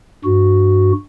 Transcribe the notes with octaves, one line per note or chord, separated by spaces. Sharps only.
G2 F#4